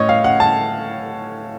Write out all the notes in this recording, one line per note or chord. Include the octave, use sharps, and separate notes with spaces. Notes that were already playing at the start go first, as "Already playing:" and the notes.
Already playing: A2 C#5 D#5
F5
F#5
A5